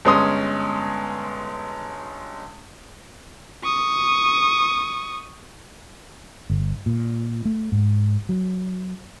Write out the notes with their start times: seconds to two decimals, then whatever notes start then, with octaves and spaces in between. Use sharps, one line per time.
0.05 G1 G#3 C#4 C6 D#6
3.64 C#6 D#6
6.50 G1
6.86 A#2
7.45 A3
7.72 G#2
8.29 F#3